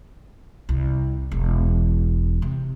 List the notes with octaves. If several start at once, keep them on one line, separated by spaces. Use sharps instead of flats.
C2
E1
C3